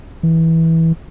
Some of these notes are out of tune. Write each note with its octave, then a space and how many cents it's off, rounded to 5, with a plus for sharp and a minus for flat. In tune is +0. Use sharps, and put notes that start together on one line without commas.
E3 -15